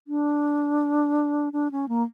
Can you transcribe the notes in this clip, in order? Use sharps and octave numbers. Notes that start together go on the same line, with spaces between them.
D4
D4
C#4
A#3